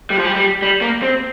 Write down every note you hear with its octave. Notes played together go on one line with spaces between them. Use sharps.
G3
F3
G3
G3
G3
A#3
C4